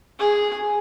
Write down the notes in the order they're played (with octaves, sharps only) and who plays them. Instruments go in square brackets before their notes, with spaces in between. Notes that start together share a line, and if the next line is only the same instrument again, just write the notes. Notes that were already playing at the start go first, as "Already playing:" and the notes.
[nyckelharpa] G#4